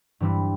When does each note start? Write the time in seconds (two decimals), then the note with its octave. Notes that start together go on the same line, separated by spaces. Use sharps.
0.20 G2 E3 G3 C4 E4